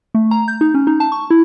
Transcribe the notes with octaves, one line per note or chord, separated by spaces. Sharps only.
A3
A#5
G6
D#4
C#4
D#4
A5
C#6
E4